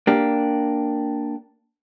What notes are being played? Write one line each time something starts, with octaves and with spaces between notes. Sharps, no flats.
A#3 D4 G4